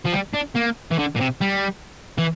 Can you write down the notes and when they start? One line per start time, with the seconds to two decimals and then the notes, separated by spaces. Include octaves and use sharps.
0.05 F3
0.12 G3
0.34 D4
0.55 A#3
0.91 E3
0.98 D3
1.16 A#2
1.21 C3
1.41 G3
2.18 E3